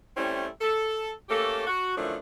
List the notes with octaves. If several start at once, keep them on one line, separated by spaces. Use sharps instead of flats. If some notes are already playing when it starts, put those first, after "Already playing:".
G3 A3 C4 C#4 E4
A4
A3 A#3 C#4 G4 A4
F#4
F#2 D#3 F3 A3 D4 E4